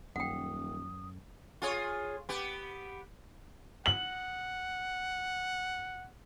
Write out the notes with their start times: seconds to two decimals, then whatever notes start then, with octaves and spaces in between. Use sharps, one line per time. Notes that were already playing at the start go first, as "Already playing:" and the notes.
0.16 D#1 F#2 F#5 G5 D#6
1.62 F4 G#4 C#5
2.29 B3 G4
3.86 F#5 F#7